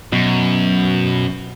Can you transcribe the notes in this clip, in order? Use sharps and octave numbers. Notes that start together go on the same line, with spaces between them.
F#2 B2